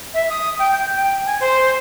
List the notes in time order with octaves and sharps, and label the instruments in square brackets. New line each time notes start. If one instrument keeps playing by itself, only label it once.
[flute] E5
D#6
G5
G6
G5
G#5
C5